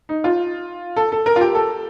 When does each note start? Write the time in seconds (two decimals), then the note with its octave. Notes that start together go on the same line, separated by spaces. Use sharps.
0.09 D#4
0.24 F4
0.96 A4
1.12 A4
1.26 A#4
1.36 F4
1.41 G4
1.55 A4